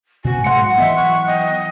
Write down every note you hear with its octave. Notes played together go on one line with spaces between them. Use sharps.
B2 F#4 G#5
G#2 F#3 F#5 C6 C#7
E3 F#3 B3 D#5 E5
C#6 F#6
D#5 G5